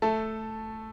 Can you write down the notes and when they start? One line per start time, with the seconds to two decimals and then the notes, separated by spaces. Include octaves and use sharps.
0.02 A3 A4